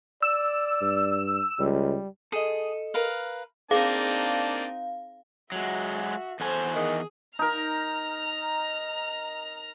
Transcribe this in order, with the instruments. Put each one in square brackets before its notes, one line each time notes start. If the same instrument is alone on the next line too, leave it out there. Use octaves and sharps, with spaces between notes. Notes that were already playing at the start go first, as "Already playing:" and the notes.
[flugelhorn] D5 [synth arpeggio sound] E6
[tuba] G2
[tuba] C#2 [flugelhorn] G3
[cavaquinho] G#4 [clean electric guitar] A4 D#5
[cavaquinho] A#4 B4 F5
[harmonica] A#3 D4 A5 [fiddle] C4 D#4 [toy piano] G#4 [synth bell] F5
[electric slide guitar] F#3 G#3 [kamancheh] F#4 E5
[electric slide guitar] E2 F#4 G#5 [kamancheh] A4 C5
[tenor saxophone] D#3 [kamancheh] G#4
[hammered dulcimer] D#4 A#4 [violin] A#5 F6